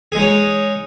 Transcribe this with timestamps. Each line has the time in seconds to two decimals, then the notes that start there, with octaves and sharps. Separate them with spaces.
0.12 G#4
0.15 G#3
0.18 D#4
0.21 C#5